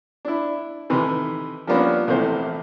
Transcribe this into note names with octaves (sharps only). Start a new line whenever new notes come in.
D4 E4
A2 C3 D#3 E3
F3 G3 A#3 B3 C#4 D4
A#1 E2 C3 A3 C5